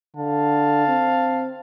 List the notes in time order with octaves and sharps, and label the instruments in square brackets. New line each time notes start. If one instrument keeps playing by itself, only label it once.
[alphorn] D3 [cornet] F5 [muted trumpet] A5
[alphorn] C4